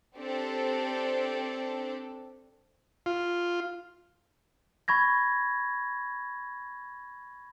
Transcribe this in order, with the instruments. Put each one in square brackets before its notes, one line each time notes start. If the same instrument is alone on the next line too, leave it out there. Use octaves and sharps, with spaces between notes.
[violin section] C4 D4 G4 A4
[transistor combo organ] F4
[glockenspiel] B5 C#6 G#6 A#6